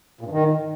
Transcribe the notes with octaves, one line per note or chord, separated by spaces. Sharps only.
A#2
G2
D#3